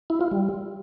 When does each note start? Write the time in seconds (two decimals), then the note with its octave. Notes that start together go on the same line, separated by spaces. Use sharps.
0.10 E4
0.21 F4
0.31 G3